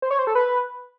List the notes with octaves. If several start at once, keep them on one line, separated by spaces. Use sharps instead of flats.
C5
C#5
C5
A4
B4